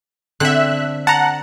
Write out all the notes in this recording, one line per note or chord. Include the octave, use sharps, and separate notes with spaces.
D3 C4 A4 E5 F#6
F#5 A5 A#5